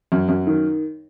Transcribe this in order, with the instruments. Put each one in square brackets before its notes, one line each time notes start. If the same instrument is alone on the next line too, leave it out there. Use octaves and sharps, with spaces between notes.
[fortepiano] F#2
F#2
D#3